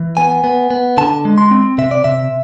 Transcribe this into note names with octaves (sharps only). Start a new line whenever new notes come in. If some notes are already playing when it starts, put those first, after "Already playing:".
Already playing: E3
B3 G#5
B3
B3
D3 A5
G#3
C6
C4
C3 E5
D5
C3 E5